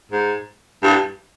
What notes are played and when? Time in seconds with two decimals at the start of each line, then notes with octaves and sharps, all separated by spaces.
0.12 G#2
0.83 G2